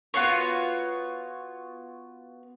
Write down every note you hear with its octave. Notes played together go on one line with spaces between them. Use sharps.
B3 F4 F#4 C#5